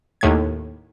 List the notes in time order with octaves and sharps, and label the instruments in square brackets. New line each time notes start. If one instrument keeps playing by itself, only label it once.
[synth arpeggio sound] D#2 A2 G#6